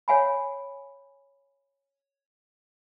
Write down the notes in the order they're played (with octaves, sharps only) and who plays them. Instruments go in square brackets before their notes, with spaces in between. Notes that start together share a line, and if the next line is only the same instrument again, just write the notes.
[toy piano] C#5 F5 G#5 B5